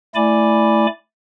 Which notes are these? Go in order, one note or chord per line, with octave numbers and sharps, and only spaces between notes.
A3 E4 D5 G#5 B5 D6